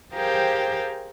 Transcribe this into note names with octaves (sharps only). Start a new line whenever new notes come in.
G4 G#4 A#4 C5 F5 G5